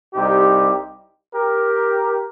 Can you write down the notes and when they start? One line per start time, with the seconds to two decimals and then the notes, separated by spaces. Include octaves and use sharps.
0.14 C2 C3 G3 D#4 G4
1.35 G4 A#4